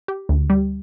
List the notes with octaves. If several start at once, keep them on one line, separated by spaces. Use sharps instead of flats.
G4
D2
G3